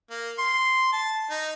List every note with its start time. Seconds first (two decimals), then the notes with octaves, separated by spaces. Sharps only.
0.10 A#3
0.39 C6
0.93 A5
1.31 D#4